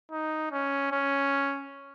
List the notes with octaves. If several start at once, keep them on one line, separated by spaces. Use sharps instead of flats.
D#4
C#4
C#4